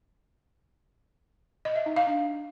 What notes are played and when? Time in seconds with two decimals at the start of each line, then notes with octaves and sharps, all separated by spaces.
1.65 D#5
1.76 E5
1.86 D#4
1.96 F5
2.07 D4